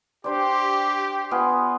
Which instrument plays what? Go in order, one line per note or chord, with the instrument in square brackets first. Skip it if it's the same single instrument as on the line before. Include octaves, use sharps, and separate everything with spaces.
[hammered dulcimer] D4 C5 D5 [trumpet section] G4
[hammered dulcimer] B3 F4 G#4